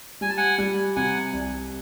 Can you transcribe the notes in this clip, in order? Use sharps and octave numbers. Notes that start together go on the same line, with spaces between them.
G3 G#5
A5
F#5 G#5
G3
C3 F#5 G#5
C2